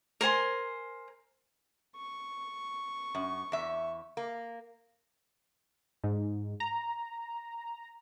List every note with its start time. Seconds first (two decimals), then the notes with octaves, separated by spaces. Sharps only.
0.21 A#4 C5 G#5 C6
1.96 C#6
3.15 F#2
3.52 E2 E5
4.17 A#3
6.04 G#2
6.60 A#5